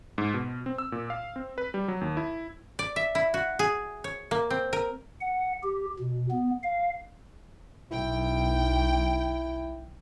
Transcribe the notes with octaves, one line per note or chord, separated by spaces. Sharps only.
G#2
B2
C4
E6
A#2
F5
C4
B4
G3
F#3
D#2
E4
D5
E5
E4
F#4
G#4
C#5
A#3
C4
A#4
F#5
G4
B2
B3
F5
B1 E4 G5